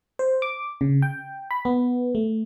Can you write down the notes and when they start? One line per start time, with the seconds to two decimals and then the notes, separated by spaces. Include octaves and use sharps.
0.19 C5
0.42 D6
0.81 C#3
1.02 G5
1.51 B5
1.65 B3
2.15 A3